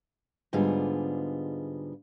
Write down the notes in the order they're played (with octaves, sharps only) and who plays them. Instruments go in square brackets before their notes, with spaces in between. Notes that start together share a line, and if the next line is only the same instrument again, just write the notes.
[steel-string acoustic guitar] G#2 D3 G3 B3 F4 G#4